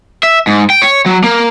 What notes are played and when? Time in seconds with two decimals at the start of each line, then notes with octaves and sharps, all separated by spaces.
0.23 E5
0.47 G#2
0.70 G5
0.82 C#5
1.06 F#3
1.24 A#3